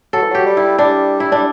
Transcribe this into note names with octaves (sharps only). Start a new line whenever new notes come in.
F#3 A4
E3
F#3 G4
G3
E4
G3 D4
E4
G3 D4